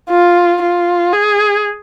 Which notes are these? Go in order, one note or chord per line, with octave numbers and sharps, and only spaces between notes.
F4
F4
G#4